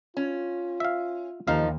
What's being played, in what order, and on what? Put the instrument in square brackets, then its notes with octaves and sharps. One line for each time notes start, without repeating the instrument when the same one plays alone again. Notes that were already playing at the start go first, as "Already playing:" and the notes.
[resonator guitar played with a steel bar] C#4 [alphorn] F4
[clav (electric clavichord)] E5 F5
[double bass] D#2 [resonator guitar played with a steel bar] F3 D#4 [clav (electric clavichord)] F5